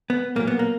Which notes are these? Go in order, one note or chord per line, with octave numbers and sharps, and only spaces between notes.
B3
B1 A#2 F#3 A#3
B3
A#3